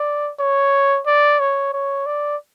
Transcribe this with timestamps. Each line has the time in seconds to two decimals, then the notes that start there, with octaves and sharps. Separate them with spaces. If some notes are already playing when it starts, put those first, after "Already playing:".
Already playing: D5
0.40 C#5
1.06 D5
1.40 C#5
1.73 C#5
2.06 D5